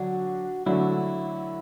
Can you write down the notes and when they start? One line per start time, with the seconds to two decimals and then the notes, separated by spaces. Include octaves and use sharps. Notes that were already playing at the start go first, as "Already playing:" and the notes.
Already playing: D3 F#3 D4 F#4
0.66 D3 F#3 A3 D4 E4